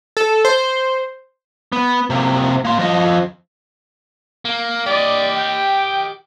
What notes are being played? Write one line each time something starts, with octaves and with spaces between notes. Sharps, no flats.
A4
C5
B3
C3 A#3
A#3 C6
F3 D#5
A#3
G4 D5 D#5
G5